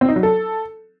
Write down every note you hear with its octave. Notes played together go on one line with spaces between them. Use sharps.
C4
D#4
F#3
A4